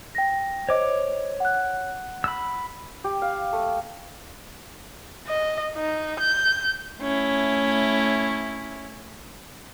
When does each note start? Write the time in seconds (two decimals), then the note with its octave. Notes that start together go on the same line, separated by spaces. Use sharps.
0.15 G5 A#6
0.69 C5 C#5 D#5 D6
1.40 F#5 F#6
2.24 B5 E6
3.04 G4
3.22 F5
3.53 A3
5.27 D#5
5.76 D#4
6.20 G6
7.00 A3 C#4 E4